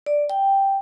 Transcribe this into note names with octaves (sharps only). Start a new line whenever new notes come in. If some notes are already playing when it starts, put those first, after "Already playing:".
D5
G5